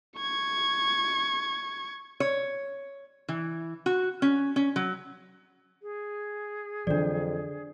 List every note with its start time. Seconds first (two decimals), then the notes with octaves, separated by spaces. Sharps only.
0.18 C#6 G#6
2.20 C#5
3.29 E3
3.86 F#4
4.22 C#4
4.56 C#4
4.76 F#3
5.82 G#4
6.87 F2 D3 E3 F#3 D4 D5